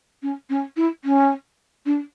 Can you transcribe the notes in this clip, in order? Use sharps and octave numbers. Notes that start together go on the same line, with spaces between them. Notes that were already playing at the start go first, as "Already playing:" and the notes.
C#4
C#4
E4
C#4
D4